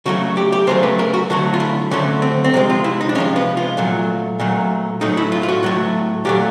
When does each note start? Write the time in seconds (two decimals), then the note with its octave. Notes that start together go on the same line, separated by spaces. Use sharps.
0.06 C#3 F#3 A3 F#4
0.37 G4
0.52 G4
0.67 C#3 F#3 A3 C5
0.83 B4
0.99 A#4
1.14 F#4
1.30 D3 F#3 A3 F#4
1.54 F4
1.60 E4
1.91 D3 F#3 A3 C#4
2.22 C4
2.44 C4
2.53 C3 F3 G#3 B3
2.70 F4
2.84 E4
3.01 D#4
3.09 D4
3.15 C3 C#4
3.18 F3 G#3
3.36 B3
3.57 F4
3.77 A#2 F#3 A3
4.40 A#2 F#3 A3
5.01 A2 F#3 A3 D#4
5.17 E4
5.32 F4
5.43 F4
5.49 F#4
5.63 A2 F#3 A3
6.25 A#2 F#3 A3 G4